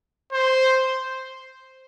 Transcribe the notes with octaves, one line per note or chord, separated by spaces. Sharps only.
C5